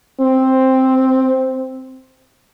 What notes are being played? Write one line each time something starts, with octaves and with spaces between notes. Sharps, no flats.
C4